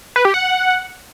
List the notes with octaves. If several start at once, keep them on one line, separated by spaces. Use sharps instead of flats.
B4
G4
F#5